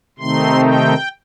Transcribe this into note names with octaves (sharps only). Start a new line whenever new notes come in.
C3 D#3 A3 C4 D#4 C6
G5